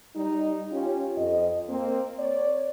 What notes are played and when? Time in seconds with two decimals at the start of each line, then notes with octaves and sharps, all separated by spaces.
0.16 G3 D#4
0.71 C#4 F4 G4
1.17 F2 D#5
1.69 A#3 C4
2.19 C#5 D5